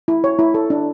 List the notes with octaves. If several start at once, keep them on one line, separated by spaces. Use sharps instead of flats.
E4
C#5
E4
A4
D4